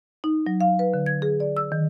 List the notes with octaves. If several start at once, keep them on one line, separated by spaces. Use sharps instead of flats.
D#4
F#3
F5
B4
D3
G#6
G#4
D5
E6
D#3